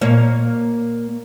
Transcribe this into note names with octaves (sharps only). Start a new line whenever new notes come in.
A#2 A#3 C#5